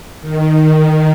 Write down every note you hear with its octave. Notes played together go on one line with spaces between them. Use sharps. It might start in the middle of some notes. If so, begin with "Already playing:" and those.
D#3